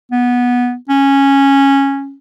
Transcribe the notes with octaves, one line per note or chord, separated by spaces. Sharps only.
B3
C#4